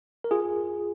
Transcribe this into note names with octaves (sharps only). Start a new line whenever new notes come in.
A#4
F4 G#4